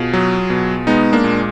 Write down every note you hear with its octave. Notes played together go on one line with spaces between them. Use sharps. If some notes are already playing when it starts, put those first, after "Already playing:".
Already playing: B2 F4 G#4
F#3
B2
G#3 B3 D#4
A#3 D4
A#2